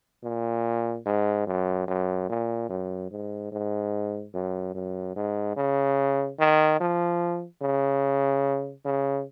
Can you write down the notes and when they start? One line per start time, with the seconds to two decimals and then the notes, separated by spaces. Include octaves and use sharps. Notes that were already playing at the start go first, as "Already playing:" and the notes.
0.24 A#2
1.06 G#2
1.47 F#2
1.88 F#2
2.29 A#2
2.69 F#2
3.11 G#2
3.52 G#2
4.34 F#2
4.75 F#2
5.16 G#2
5.56 C#3
6.39 D#3
6.80 F3
7.62 C#3
8.85 C#3